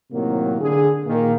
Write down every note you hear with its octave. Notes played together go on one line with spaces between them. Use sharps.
A2 C3 D#3 F#3 A#3
D3 G#4
A#2 D#3 A#3